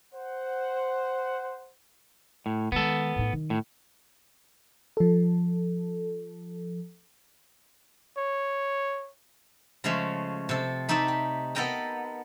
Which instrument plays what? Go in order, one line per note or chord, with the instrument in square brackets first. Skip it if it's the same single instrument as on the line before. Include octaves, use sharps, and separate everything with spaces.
[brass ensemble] C5 F#5
[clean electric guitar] A2
[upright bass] D#3 G#3 [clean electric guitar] B3 A4
[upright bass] A2 D#4
D#3 D#4
[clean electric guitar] A2
[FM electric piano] F3 A4
[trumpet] C#5
[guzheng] C#3 F3 G#3 A3 C#4
C3 A4
A3 D#4 G4 D5 E5
G4
B3 A4 A#4 D#5 G5 A#5